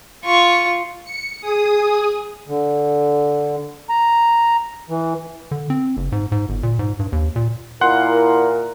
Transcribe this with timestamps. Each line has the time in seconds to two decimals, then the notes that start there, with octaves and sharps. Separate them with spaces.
0.25 F4 C#6
1.03 C#7
1.40 G#4 D#6
2.48 D3
3.90 A#5
4.89 E3
5.51 D3
5.70 C4
5.97 F#1
6.12 G#2
6.32 G#2
6.49 G1
6.63 A#2
6.79 G#2
6.99 G2
7.12 D#2
7.36 A#2
7.81 A#2 E4 A#4 F#5 C6 F#6